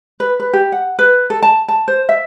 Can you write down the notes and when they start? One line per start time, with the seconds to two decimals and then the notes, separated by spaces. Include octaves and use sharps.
0.20 B4
0.40 B4
0.53 G4
0.72 F#5
0.99 B4
1.30 A4
1.43 A5
1.68 A5
1.88 C5
2.09 E5